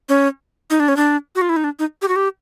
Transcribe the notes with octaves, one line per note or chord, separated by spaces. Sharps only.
C#4
D#4
D4
C#4
D4
F#4
F4
E4
D#4
D4
D#4
G4
F#4
G4